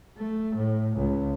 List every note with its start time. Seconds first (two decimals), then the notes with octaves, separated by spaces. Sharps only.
0.17 A3
0.55 A2
0.96 C#2